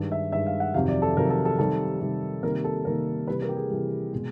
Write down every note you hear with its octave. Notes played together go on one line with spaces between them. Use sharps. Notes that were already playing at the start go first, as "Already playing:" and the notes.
Already playing: G2 D#3 G#3
E5
G2 D#3 G#3 E5
F5
F#5
F2 C3 D#3 F#3 F5
D5
A4
F2 C3 D#3 F#3 A#4
A4
A4
C3 D#3 G3 A4
C3 D#3 G3
C3 D#3 G3 A#3 A#4
A4
C3 D#3 G3 A#3 A#4
C3 E3 G3 B4
A#4
G4
G#4
C3 E3 G3
B2 G#3